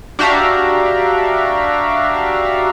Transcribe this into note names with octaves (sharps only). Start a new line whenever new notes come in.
D4 F#4 G4 E5 F5 A#5